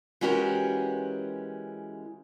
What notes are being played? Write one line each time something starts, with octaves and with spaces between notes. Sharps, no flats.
E3 G#3 C#4 F#4 G4 A#4